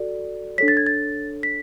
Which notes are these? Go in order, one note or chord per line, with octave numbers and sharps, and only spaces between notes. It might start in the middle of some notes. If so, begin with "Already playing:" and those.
Already playing: F#4 A4 D5
D4 A4 C#5 B6
A6
G#6
A6
B6